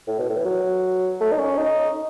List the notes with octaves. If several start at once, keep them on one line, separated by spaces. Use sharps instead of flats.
A2
B2
A2
E3
F#3
A3
D#4
C#4
D#4